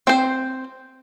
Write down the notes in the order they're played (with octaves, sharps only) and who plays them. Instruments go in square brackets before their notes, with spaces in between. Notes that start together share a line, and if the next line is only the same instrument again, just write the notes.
[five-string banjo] C4 C5